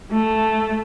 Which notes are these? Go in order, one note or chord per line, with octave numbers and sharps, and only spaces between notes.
A3